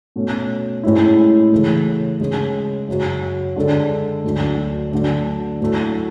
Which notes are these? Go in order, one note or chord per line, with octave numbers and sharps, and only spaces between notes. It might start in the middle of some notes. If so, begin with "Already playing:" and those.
B2 A3 C#4
A2 G#3 C#4 E4
C#3 E3 A3
C#3 G#3 C#4 G#4
F#2 C#3 F#3
D3 G#3 D4 A4
D2 D3 F#3 A3
D3 F#3 A3 D4
A2 F#3 A3